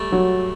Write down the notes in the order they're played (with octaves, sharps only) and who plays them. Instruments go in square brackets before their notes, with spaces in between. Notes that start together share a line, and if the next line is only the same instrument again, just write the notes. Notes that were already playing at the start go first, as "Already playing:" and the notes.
Already playing: [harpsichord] G3 A3
[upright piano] F#3